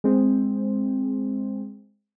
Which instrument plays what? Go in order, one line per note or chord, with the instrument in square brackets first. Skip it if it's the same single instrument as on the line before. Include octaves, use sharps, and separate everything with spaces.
[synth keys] G#3 C4